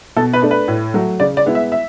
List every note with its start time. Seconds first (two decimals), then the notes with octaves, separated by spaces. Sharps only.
0.16 B2 A4
0.33 B4
0.42 A3 D4
0.51 B4
0.68 A2
0.94 F#3 A3
1.20 C#3 D5
1.37 D5
1.46 G#3 B3 E4
1.55 E5
1.72 E5